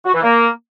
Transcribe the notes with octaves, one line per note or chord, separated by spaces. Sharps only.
F#4
E3
A#3